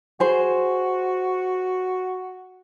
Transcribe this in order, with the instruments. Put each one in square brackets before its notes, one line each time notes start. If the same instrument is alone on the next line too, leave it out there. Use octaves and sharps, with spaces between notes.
[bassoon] F#4 [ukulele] G#4 C5